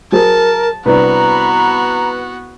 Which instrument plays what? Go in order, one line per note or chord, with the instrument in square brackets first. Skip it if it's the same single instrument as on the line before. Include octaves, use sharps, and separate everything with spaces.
[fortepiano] F#3 G#4 C5 [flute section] A#4 [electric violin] A5
[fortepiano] C2 D4 [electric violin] B3 F#4 [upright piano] B4 [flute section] A#5 B5